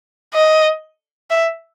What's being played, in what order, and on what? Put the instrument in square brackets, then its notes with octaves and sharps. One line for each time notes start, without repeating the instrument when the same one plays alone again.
[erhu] D#5
E5